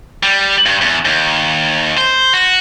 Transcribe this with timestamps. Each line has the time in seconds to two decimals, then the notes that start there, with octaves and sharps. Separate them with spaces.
0.23 G3
0.66 G2
0.81 E2
1.05 D#2
1.97 C5
2.33 F#4